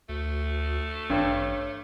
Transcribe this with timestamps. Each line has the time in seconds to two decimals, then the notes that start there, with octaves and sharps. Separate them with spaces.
0.09 D2 A3 F#4
1.10 A1 G2 C#5